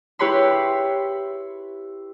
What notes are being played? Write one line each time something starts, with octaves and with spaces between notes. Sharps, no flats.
E4 G4 B4 C#5 B5 C6